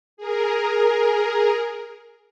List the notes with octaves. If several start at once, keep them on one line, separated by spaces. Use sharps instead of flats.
G#4 A#4